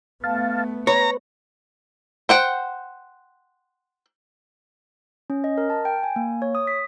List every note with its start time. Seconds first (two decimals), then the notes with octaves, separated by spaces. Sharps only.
0.24 A3 B3 F5 A5
0.87 B4 C#5 A#5
2.29 C5 F#5 G5
5.30 C#4
5.44 D#5
5.58 A#4
5.70 A5
5.85 G5
6.03 G#5
6.16 A#3
6.42 C#5
6.55 D#6
6.67 B6